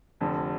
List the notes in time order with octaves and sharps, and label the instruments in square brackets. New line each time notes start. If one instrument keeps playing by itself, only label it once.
[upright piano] F1 F2 D3